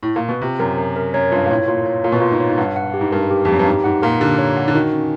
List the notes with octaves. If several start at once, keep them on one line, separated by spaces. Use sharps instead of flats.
A2
A#2
B2
C3 F4
F#2 A#4
F#2 A#4
A#4
F#2 C#5
G2 F4
A#2
A2 C#5
A#2 F4
C#5
A#2 F4
B2
A#2 F4
G#2
C#5
G#2
G2 F#5
F#5
G4
G#2
G2 A#4
G4
F2
F#2 G4
G2
G#2 G4
G#2 F#5
A#2 A#4
D3 G4
C#5
F#5
D3
D#3 F#4
C#4